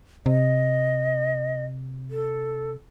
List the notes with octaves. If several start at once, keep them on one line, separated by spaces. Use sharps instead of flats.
C3 D#5
A4